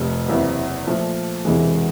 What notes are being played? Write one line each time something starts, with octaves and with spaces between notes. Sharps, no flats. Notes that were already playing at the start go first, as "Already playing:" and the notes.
Already playing: F1 F2 C3
F#1 E2 C3 E3
A#2 F3 A3
E1 E2 C3 E3 G#3